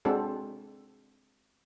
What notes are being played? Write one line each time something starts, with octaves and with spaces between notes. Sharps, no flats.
G#3 C4 D4 F#4 A4